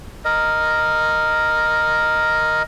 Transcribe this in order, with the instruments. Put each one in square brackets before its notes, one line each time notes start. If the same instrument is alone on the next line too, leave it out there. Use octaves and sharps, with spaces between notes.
[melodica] A#4 D#5